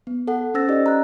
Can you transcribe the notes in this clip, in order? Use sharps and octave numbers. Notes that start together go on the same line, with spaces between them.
B3
A4 F#5
C#4 C5 E6 A6 A#6
C#4 D#4 G4 D5 D#5
A#5 F#6